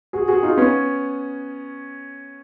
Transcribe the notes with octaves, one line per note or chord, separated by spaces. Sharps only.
F#4 G#4
F#4 G#4
D#4 F4
B3 C#4